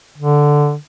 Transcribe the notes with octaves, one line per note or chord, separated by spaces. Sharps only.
D3